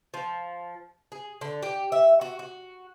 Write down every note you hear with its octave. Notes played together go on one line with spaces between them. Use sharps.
F3
G#4
D3
G4
E5
F#4
F#4